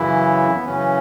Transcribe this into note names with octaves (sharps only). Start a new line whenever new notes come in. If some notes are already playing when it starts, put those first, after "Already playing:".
Already playing: F#2 C#3 E3 E4
B3
F#2 C#3 E3 C#4